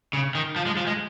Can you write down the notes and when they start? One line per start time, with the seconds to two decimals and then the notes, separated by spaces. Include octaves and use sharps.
0.13 C#3
0.35 D#3
0.56 F3
0.66 G#3
0.77 F3
0.87 G#3